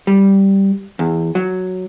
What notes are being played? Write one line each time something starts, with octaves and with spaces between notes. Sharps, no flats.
G3
E2
F#3